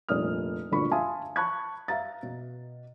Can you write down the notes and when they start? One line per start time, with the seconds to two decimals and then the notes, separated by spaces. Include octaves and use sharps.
0.09 F1 G2 A#2 D#6 F6
0.71 G1 D2 A#2 F4 B5 C#6
0.91 E5 F5 G#5 A5 C6 D#6
1.36 A5 B5 C#6 F#6 G#6
1.88 E5 F5 A#5 A6
2.23 B2